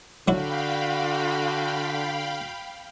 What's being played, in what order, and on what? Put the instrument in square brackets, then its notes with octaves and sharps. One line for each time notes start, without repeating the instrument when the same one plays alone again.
[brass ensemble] D3 [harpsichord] F#3 E4 [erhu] F#4 [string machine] F5 G5 B5